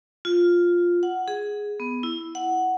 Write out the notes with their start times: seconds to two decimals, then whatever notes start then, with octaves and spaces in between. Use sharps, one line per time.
0.25 F4
1.03 F#5
1.28 G#4
1.80 B3
2.03 E4
2.35 F#5